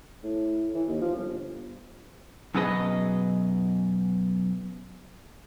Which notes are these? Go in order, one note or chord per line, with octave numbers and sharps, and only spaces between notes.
A2
E3
D#2
F3
G1
F#2 B2 B3 G#4 B4 D#5